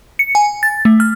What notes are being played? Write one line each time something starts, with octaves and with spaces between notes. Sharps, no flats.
C#7
G#5
A6
A3
F6